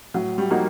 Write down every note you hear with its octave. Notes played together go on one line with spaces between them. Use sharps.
A2 F#3
G3
F3 A#3 D#4 F#4